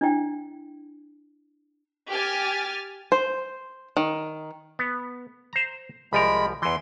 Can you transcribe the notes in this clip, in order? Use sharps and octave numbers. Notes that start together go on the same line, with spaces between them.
D4 E4 G5
G4 G#5 F6 A6
C5
D#3
B3
C5 A#5
C2 F3 G#3 A#4 B5
E2 E3 C6